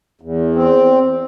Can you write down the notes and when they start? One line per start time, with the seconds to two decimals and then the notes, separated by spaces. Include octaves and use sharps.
0.21 E2
0.55 C4